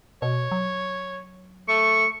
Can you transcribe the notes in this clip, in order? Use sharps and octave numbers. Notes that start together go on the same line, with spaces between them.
B2 C#5
F#3
A3 C#6